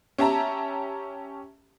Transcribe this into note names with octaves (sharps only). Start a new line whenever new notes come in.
C#4 G4 E5 A5 A#5